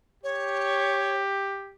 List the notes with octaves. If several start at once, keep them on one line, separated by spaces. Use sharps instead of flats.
G4 C#5